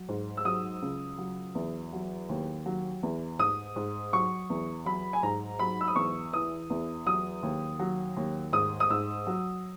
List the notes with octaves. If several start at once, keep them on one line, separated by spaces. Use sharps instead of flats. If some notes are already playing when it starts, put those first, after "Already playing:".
Already playing: F#3
G#2
E6
F#3 D#6
C#2
F#3
E2
F#3
D#2
F#3
E2
G#2 D#6
G#2
F#3 C#6
E2
F#3 B5
G#5
G#2 A#5
F#3 B5
E6
D#6
E2 C#6
E3 D#6
E2
F#3 D#6
D#2
F#3
D#2
G#2 D#6
D#6
G#2 E6
F#3